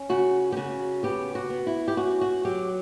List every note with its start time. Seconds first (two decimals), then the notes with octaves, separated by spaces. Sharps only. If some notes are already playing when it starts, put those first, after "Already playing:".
Already playing: C#4
0.09 C#3 F#4
0.52 G4
0.56 C#3 F#4
1.03 B3 G4
1.35 F#4
1.50 B3
1.67 E4
1.88 G4
1.97 C#4 F#4
2.21 F#4
2.45 F#3 G4